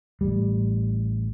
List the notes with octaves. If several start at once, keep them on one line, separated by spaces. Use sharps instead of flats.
A1 G3